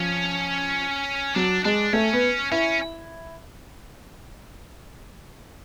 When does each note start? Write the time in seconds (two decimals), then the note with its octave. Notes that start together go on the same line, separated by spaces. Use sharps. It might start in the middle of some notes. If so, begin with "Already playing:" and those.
Already playing: F3 C#4
1.35 F#3 D4
1.65 G#3 D4
1.93 A3 C#4
2.13 B3
2.52 C#4 E4